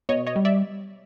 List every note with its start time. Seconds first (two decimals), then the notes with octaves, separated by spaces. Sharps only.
0.09 B2 C#5 D#5
0.27 C#5 D#5
0.36 G3
0.45 D5 E5